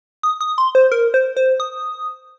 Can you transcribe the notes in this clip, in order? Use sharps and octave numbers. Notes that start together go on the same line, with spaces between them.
D#6
D#6
C6
C5
A#4
C5
C5
D#6